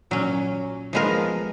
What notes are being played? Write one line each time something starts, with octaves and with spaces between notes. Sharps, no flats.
A#2 F#3 C#4
F3 G#3 B3 F4 A#4